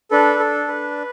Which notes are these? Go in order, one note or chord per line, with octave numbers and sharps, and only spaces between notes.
D4 A4 B4
A4
B4